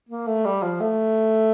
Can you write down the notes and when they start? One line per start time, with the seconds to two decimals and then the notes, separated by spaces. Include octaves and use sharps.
0.09 A#3
0.27 A3
0.45 G3
0.63 F3
0.80 A3